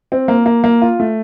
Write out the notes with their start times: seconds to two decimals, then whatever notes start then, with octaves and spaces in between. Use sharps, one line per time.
0.12 C4
0.28 A#3
0.46 A#3
0.64 A#3
0.82 F4
1.00 A3